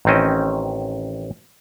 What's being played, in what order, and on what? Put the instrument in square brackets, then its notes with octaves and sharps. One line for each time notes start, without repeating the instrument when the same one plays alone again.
[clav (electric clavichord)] A1 D#3 C4 C#4 D#5